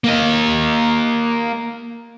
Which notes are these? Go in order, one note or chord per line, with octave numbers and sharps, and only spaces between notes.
A#3 D#5